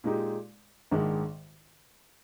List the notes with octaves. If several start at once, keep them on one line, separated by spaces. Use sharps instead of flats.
A#2 G#3 D#4 G4
A#1 G#2 D#3 G#3 D4